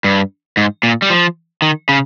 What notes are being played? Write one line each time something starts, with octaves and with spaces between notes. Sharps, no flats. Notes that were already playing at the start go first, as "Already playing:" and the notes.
G2
G#2
A#2
G3
F3
D#3
C#3